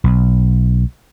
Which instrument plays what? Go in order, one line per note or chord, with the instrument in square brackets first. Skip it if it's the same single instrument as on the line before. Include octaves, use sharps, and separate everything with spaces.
[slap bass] B1